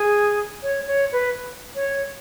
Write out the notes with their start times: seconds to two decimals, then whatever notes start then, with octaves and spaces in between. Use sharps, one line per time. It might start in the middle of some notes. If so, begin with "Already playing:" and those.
Already playing: G#4
0.63 C#5
0.88 C#5
1.12 B4
1.76 C#5